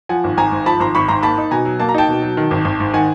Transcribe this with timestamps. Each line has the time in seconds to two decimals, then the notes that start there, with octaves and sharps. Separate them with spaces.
0.09 F3 F#5 G#5
0.24 G#1
0.37 G#1 G#5 A#5
0.52 G#2
0.66 F3 A5 B5
0.80 G#1 A#5 C6
0.95 G#1 B5 C#6
1.08 G#2 A#5 C6
1.23 A#3 A5 B5
1.38 D#4
1.51 B2 G#5 A#5
1.65 F#3
1.80 A#3 A5
1.89 A#5
1.94 D#4 G5 A5
2.08 B2
2.22 F#3
2.37 D#3
2.51 G#1
2.65 G#1
2.80 G#2
2.93 D#3 F#5 G#5